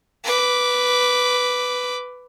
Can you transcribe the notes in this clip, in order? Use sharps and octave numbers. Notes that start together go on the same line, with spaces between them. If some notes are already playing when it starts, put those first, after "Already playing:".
B4 D6